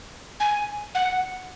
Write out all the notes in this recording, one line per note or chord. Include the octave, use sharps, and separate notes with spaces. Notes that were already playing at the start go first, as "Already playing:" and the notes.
G#5
F#5